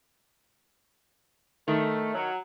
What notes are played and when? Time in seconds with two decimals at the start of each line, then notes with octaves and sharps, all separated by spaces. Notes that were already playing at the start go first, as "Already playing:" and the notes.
1.68 D#3 A3
2.14 F#3